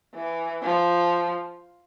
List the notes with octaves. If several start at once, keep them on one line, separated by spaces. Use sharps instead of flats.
E3
F3